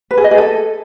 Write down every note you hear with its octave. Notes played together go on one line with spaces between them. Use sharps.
B4
G#4
D#5
G#4
A4